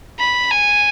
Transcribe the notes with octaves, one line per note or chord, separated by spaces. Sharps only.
B5
G#5